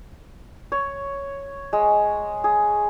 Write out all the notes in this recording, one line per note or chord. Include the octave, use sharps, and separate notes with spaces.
C#5
G#3
G#4